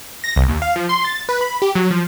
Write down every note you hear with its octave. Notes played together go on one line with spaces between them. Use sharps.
A#6
C2
D#2
F5
F3
C6
A6
B4
B5
G4
F#3
F3